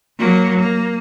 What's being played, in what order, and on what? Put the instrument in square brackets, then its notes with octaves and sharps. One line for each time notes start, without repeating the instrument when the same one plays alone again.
[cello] F#3 A#3
A#3